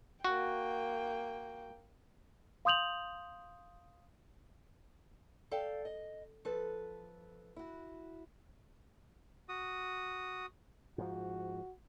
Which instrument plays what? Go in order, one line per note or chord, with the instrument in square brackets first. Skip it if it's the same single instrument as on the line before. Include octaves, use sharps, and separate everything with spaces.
[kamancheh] A#3 G5 [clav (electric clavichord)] F#4
[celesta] F5 C6 D#6 G6 F7 F#7
[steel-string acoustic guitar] A4 D5 F5 G5
D#5
F3 A4 B4
E4 F#4
[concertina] F#4 D#6
[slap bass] G#2 F3 [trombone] F#4